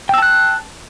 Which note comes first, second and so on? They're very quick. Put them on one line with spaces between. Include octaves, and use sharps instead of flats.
G5 E6 A5 F#6